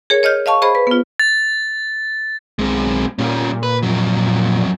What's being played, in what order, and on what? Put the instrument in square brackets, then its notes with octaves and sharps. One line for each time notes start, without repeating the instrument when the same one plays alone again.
[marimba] G#4 A#4 C#5
C#5 D#5 F6 G6
D#5 F5 A5 C#6
G#4 C5 D#5 B5
B4
B3 F4
[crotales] A6
[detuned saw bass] B1 [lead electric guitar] G#3 C4
[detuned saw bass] A#2 [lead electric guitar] G3 C#4
[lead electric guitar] B4
F2 F#3